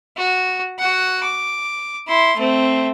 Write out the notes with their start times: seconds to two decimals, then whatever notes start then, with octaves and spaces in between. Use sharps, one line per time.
0.17 F#4
0.79 F#4 F#5
1.23 D6
2.08 E4 C6
2.37 A3 C4